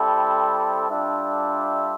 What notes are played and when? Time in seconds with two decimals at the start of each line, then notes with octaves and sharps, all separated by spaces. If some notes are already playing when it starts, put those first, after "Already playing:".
Already playing: G3 C4 E4 A4
0.90 G3 D4 F4 A4 E5